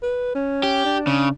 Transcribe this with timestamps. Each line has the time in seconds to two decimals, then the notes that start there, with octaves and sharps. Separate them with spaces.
0.03 B4
0.35 C#4
0.63 G4
0.85 D4
1.07 C#3